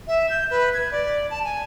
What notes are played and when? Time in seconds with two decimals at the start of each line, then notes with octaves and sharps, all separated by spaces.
0.08 E5
0.30 G6
0.50 B4
0.74 G#6
0.92 D5
1.30 A5
1.44 G#5